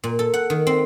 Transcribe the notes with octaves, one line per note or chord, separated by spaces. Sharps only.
A#2
A4
F#5
D#3
C4